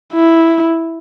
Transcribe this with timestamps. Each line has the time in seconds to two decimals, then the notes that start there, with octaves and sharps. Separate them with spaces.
0.13 E4